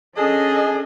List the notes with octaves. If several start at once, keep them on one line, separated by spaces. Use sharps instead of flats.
C#4 D4 G#4 A4 D#5